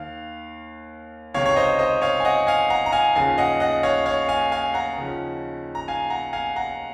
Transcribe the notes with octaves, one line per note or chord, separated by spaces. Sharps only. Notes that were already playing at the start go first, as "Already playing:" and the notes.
Already playing: D#2 D#3 F5
C#2 C3 D#3 C#5 F5
C#5
C5 D#5
C5 D#5
C#5 F5
G#5
D#5 F#5
F5 G#5
F#5 A#5
A#5
F5 G#5
D#2 C#3 F3 F5 G#5
D#5 F#5
D#5 F#5
C#5 F5
C#5 F5
F5 G#5
F5 G#5
F#5 A#5
D#2 C#3 F3
A#5
F5 G#5
F#5 A#5
F5 G#5
F#5 A#5